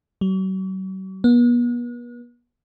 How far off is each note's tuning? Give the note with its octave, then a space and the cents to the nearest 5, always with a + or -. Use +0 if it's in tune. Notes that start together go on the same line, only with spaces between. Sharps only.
F#3 +45
B3 -40